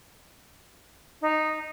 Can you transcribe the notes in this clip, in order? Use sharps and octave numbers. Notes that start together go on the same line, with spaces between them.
D#4